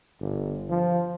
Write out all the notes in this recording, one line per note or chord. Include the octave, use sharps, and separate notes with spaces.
G1
F3